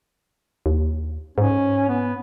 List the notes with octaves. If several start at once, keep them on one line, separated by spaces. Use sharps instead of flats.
D#2
G#2 C#4
B3